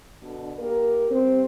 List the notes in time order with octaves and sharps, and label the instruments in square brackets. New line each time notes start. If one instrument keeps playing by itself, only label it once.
[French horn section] B2 D3 D4
A#3 G4 A#4
C3 G3 C4